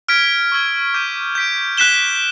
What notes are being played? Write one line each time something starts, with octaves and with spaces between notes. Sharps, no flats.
F6 G#6 B6 D7
C#6 E6 G#6
D6 G6 B6 D#7
G6 B6 D7
F#6 B6 E7 G7